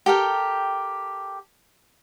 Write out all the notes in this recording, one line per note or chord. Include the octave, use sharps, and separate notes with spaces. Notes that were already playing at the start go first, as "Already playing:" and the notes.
G4 A4 A#4 G5